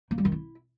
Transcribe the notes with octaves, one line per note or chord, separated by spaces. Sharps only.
A#3
G3
D#3
E4